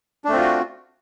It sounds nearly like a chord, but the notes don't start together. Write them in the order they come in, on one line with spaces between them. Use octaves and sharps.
D4 A3 C4 F4 F#4